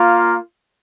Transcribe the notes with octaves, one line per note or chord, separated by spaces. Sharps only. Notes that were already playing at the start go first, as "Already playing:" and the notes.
Already playing: A#3 F4